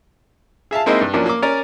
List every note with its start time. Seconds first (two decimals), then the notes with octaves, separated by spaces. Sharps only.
0.71 G#4 E5 F5 A5
0.86 G#3 A#3 C4 D#4 E4 C5
1.01 G2
1.13 F3 F#3 A#3 C#4 D4
1.26 A#3 D6
1.42 C#4 A#4 D5